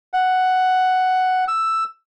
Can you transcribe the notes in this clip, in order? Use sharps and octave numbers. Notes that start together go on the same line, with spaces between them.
F#5
E6